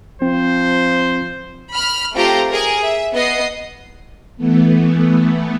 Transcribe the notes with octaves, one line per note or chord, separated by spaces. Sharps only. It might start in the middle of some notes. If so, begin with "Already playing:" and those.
F3 C4 C5
B5 F6
A3 C4 F4 G4 A#5
G#4 A#4
E5
B3 D#5 C7
E3 A3 B3